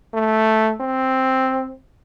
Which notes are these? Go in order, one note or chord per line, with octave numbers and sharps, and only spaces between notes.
A3
C4